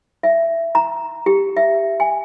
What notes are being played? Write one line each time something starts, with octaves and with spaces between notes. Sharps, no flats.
E5
A#5
G4
E5
G#5